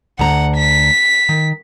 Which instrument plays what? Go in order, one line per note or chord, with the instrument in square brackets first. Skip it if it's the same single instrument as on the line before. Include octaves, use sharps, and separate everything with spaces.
[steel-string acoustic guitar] D2 A#5 [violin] F#5
[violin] B6
[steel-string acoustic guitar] D#3